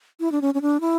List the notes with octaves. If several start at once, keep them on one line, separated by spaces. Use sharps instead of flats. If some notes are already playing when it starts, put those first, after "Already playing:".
E4
D4
C#4
C#4
D4
E4